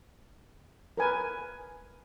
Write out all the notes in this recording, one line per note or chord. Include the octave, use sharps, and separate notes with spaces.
A#4 B4 G#5